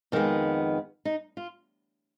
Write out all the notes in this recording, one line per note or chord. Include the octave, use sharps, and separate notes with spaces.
F2 D#3 G#3 B3
D#4
F4